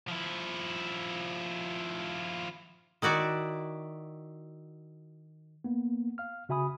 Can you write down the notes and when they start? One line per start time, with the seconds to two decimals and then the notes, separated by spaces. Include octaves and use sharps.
0.08 F3 E4
3.02 D#3 E4 F#4 D5 F#5
5.64 A#3 B3
6.18 F5 F6
6.49 C#3 F#4 E5 G#5 B5 D#6